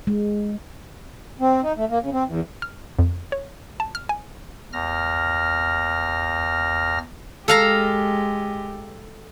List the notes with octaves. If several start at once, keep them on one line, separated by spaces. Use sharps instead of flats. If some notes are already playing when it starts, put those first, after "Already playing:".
G#3
C4
D#4
A3
A#3
C#3
C4
E2
F6
F2
C#5
A5
F6
G#5
E2 F6 A#6
G#3 G4 A4 F5 A#5